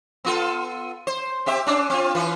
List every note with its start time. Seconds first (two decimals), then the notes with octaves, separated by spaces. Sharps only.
0.25 B3 F4 A4
1.07 C5
1.46 C4 G4 E5
1.67 C#4 D4
1.90 C4 F4
2.15 E3 F4 B4